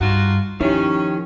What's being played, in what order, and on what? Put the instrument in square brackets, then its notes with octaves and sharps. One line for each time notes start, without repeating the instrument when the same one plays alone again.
[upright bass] G2 [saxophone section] D#4 F4 F#4
[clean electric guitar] D#3 [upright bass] F3 [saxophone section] C#4 [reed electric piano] E4 G4